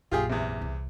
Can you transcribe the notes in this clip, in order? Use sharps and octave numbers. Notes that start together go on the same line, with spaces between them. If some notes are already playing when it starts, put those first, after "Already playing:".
A#1 F#2 F4 G4 G#4
E2 C3
C2